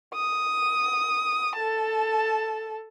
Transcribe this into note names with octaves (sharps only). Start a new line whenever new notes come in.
D#6
A4 A5